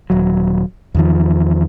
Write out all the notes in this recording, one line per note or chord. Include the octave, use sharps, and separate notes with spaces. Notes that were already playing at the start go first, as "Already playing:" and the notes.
D#1 F#3
E2 D#3 F3